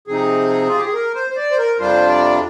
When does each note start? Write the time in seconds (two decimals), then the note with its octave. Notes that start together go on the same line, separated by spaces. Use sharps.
0.07 C3 F3 C4 D#4 G#4
0.68 F4
0.77 G4
0.85 G#4
0.93 A#4
1.15 C5
1.30 C5
1.36 D5
1.51 C5
1.58 A#4
1.79 F2 C3 G3 D4 F4 C5
2.08 D5